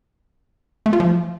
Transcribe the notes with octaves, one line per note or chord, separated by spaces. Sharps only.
A3
F4
F3